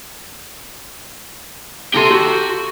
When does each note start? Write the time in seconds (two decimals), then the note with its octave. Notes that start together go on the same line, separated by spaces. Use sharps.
1.94 G4 A4 A#5 C6
2.10 F#4 G4